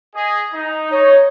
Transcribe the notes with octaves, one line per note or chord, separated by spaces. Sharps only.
G#4 D#5
D#4
D#4 C#5